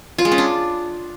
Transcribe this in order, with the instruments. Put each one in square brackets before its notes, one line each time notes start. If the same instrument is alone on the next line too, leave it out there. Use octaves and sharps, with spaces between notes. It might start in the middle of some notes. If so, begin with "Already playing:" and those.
[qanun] F4
G#3
C#4
D4